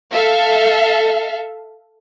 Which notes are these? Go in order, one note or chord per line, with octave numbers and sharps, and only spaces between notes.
A4 E5 F5